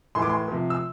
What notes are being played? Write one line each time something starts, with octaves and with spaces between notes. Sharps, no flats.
A2 E3 C6
D6
C6
C3 F3
E6